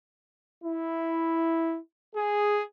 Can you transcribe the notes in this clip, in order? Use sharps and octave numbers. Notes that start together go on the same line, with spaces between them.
E4
G#4